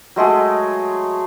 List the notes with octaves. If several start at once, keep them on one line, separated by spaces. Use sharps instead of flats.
F#3 G#3 A3 G#4